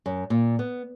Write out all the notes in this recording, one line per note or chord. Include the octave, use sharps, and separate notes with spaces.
F#2
A#2
B3